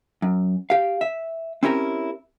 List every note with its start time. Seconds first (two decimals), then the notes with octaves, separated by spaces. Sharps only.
0.22 F#2
0.70 G4 F5
1.01 E5
1.63 C4 C#4 E4 G4 A#4